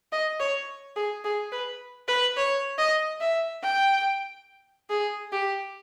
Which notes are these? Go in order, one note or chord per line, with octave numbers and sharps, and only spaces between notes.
D#5
C#5
G#4
G#4
B4
B4
C#5
D#5
E5
G5
G#4
G4